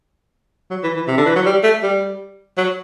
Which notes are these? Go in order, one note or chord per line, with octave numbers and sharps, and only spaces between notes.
F#3
E3
E3
C3
D3
E3
F#3
G3
A3
G3
F#3